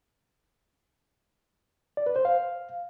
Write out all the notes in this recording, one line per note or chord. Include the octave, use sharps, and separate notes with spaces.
D5
B4
C5
F5